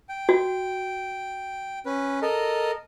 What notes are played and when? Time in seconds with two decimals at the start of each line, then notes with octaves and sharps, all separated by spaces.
0.09 G5
0.29 F#4
1.86 C#4 B4
2.22 A4 A#4 D#5